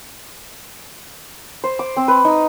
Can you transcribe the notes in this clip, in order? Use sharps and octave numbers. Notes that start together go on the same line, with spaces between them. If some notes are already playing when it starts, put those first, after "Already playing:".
C5
D6
C4
B4
D#4